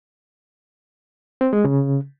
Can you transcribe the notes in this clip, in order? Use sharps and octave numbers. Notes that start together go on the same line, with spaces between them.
C4
G#3
C#3